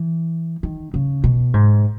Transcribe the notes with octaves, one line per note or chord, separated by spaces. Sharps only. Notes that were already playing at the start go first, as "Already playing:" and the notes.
Already playing: E3
D#3
C#3
B2
G#2